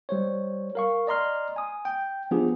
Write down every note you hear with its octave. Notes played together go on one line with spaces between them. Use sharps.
G3 C5 C#5
A#4 F5 C#6
D5 D#5 A#5 C6 F6
G#5 D#6
G5
F3 B3 D4 F4 G4 G#4